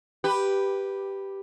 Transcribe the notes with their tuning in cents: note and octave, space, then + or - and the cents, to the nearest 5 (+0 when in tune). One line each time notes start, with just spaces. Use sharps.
G4 +0 B4 +0